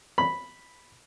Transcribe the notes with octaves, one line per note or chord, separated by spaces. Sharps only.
B5